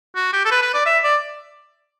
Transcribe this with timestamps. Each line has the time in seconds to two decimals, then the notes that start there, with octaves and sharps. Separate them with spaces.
0.15 F#4
0.33 G4
0.45 A4
0.51 B4
0.62 B4
0.74 D5
0.86 E5
1.04 D5